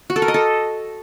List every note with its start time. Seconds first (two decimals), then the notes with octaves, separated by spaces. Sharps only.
0.10 F#4
0.16 A4
0.22 A#4
0.28 D#5
0.34 A4